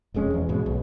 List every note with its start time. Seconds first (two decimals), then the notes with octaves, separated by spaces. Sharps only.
0.14 E1 F2 G#3 C#4
0.34 E2
0.49 G#2 B2 G#3
0.66 B1